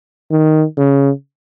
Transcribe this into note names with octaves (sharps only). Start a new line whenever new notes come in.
D#3
C#3